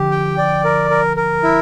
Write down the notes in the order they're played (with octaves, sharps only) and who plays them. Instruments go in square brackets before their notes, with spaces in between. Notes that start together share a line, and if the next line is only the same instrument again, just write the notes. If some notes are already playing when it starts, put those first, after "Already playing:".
Already playing: [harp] D3 F3 [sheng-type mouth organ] G4
[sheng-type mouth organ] G5
D5
A#4
A#4
A#4
E4